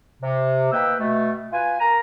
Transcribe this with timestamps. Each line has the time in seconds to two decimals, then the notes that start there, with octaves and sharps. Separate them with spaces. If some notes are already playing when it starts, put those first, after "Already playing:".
0.22 C3
0.72 D#3 A#3 B4 G5 E6
0.99 B2 A3
1.52 F4 B4 G#5
1.80 A#4 A#5